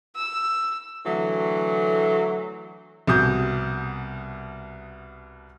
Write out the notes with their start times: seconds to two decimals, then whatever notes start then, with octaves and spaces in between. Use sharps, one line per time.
0.15 E6
1.06 D3 E3 F#3 A3
3.07 C2 B2 D#6 G6